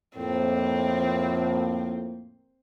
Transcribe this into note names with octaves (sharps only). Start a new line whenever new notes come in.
F2 A2 A#3 C4